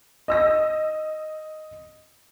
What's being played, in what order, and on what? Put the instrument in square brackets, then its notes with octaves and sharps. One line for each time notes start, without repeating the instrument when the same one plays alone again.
[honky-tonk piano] D#5 E6 A#6